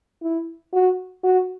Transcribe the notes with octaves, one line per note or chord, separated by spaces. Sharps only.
E4
F#4
F#4